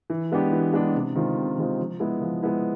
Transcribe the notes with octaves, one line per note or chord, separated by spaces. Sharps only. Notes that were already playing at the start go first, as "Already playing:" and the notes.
E3
G#3 B3 D4 G4
E3
G#3 B3 D4 G4
C3
D#3 G#3 C4 F4
C3
D#3 G#3 C4 F4
F3
G#3 B3 E4
F3
G#3 B3 E4